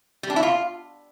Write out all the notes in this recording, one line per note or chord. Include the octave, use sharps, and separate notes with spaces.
G3
D4
E4
F4